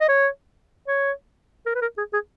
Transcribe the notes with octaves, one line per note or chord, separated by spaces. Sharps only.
D#5
C#5
C#5
A#4
B4
A#4
G#4
G#4